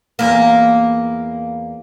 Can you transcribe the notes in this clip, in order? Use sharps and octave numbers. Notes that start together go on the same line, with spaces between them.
E2 A#3